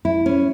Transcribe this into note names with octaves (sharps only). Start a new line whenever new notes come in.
E4
C#4